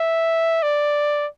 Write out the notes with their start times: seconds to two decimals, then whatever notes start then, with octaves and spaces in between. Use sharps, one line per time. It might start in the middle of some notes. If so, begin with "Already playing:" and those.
Already playing: E5
0.63 D5